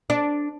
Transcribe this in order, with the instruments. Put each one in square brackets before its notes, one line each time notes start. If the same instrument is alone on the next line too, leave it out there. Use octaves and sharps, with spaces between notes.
[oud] D4